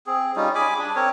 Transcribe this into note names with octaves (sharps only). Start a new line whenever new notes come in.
C4 G#4
G3 C#4 D#4 F4
G#4 G#5 B5 D6
D4
C4 A#4 C#5